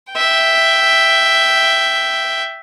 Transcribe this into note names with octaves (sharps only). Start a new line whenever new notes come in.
E5 G5